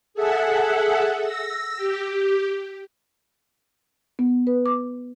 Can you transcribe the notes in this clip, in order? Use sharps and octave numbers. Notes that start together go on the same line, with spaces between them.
G#4 A4 E5 F#5
E6 A#6
G4
B3
B4
D6